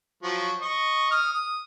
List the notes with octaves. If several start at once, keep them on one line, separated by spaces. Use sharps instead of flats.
F3 F#3 F#4
D#5 C#6
D#6 F6
D#6